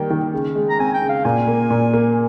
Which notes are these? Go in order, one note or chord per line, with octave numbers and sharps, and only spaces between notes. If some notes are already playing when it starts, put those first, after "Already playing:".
Already playing: D#3 G3 A#3 G5
D#3
C#3
G#3
A#5
C4 G#5
G5
C#3
F5
A#2 G#5
A#3
A#2
A#3